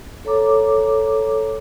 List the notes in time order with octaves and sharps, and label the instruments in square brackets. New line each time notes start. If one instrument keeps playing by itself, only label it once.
[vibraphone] A4 C#5 A#5 D6